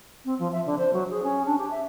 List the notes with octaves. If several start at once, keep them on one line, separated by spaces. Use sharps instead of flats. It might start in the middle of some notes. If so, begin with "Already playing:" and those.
C4
F3
E5
D3
C5
F#3
G#4
C#4
D4
G4
E5